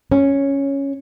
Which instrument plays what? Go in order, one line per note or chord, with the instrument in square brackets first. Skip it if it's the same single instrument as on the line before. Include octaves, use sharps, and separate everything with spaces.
[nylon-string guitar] C#4